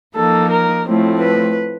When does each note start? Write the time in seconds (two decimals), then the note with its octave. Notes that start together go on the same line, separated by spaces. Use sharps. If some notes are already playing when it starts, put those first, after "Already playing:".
0.14 F3 A#3 D#4 A4
0.50 A#4
0.84 A2 F3 A3 C4
1.20 B4